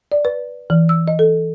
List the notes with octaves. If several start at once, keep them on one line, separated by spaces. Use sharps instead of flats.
D5
B4
E3
E6
D#5
A4